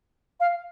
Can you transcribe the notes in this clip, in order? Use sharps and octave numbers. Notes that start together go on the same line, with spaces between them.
F5